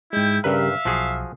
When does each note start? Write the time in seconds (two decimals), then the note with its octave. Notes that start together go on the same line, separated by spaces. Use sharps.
0.13 G#2 G#3 E4 G5
0.44 G2 C#3 G3 A#4 B4 E5 F5
0.85 B1 F3 F#4 G#4